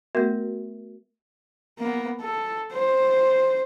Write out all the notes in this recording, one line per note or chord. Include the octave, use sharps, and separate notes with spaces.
A3 B3 F#4 A#4 E5
A#3 B3
A4
C5